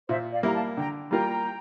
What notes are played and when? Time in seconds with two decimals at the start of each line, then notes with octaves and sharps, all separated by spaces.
0.09 A#2 C5 E5
0.31 D5 F5
0.43 G3 A#3 E4 A#5
0.54 F5 A5
0.77 D3 G5 A#5
1.11 G3 A#3 F4 A#4 G5 A#5